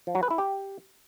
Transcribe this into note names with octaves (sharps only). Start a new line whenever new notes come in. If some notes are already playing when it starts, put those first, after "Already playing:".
F3
F#3
B4
E4
G4